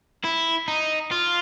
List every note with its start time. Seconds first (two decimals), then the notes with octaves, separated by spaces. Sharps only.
0.24 E4
0.68 D#4
1.12 F4